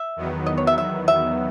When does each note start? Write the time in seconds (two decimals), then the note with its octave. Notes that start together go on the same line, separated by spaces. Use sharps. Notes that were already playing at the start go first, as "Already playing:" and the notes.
Already playing: E5
0.16 E2 D#3 F#3 B3
0.46 D#5
0.58 C#5
0.67 E5
0.78 E5
1.08 E5